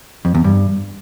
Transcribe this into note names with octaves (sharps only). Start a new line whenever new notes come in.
F2
E2
G2